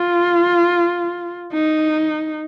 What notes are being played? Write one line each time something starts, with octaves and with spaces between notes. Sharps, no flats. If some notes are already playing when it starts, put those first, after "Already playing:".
Already playing: F4
D#4